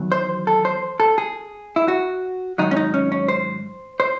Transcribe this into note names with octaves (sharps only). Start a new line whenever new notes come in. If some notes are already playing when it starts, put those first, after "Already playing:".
Already playing: E2 D#3 F#3
C5
A4
C5
A4
G#4
E4
F#4
G#2 D#3 F#3 D#4
C#4
D#4
C#4
C#4
C5
C5